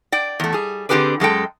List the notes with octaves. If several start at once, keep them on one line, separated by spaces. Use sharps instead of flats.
D5 G5
E2 A3
G3 G#4
D3 C4 G4 G#4 B4 D5
F#2 G#3 A4 G5